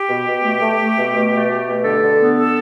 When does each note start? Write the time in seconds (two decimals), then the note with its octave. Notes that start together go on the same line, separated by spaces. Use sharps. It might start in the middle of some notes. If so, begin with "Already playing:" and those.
Already playing: G4
0.09 B2
0.26 B2
0.43 A3
0.61 A3
0.79 A3
0.96 B2
1.14 B2
1.32 A3
1.49 B2
1.66 B2
1.84 D3 A4
2.02 D3
2.19 B3
2.37 A4